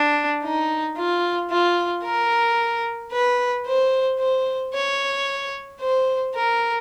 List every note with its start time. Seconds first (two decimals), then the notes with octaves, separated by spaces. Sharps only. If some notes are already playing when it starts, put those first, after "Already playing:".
Already playing: D4
0.43 D#4
0.97 F4
1.51 F4
2.04 A#4
3.12 B4
3.66 C5
4.19 C5
4.74 C#5
5.81 C5
6.35 A#4